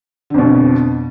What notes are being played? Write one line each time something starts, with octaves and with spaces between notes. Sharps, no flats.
F2 B2 D3